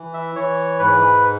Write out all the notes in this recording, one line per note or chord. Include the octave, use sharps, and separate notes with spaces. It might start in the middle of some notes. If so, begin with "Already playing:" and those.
Already playing: E3
E5
E3 C#5
G#2 B4